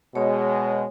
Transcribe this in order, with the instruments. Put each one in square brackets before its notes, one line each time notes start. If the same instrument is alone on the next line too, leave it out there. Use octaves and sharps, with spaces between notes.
[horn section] B2 G#3 [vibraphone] C#5